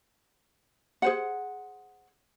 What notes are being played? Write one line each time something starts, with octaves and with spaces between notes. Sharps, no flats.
G#4 C5 F#5